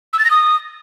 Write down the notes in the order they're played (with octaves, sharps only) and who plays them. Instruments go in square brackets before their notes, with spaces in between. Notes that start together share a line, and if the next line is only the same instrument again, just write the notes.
[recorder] E6
A6
A#6
D#6